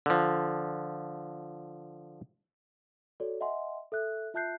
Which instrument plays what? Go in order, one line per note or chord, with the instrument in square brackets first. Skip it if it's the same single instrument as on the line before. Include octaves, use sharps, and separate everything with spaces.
[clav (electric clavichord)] D3 F3
[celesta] F#4 A4 C#5 D5
D#5 E5 F#5 G#5 C6
A4 E5 F#6
F4 E5 A5 F#6 G6 C7